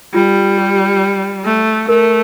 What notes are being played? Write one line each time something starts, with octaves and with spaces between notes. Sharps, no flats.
G3 F4
G4
A3
A3 A#4